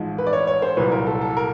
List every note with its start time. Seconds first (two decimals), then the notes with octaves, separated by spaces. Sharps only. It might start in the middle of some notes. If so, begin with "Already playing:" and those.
Already playing: A1 G#2 F3 G#3
0.18 B4
0.27 D5
0.33 C#5
0.47 C#5
0.62 C5
0.77 C2 A#2 F#3 B4
0.92 A#4
1.07 A4
1.22 A4
1.37 A#4